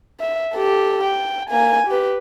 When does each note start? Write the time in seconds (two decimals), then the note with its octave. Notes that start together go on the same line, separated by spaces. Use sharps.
0.20 E5
0.53 G4 A4
1.03 G5
1.49 A#3 G#5
1.87 G4 B4